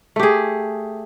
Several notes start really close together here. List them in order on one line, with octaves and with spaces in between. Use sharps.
A3 G4 G#4